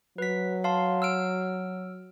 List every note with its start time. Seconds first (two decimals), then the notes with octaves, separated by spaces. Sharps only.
0.18 F#3 B4 B6
0.64 F5 A5 C6
1.02 E6 F6 D7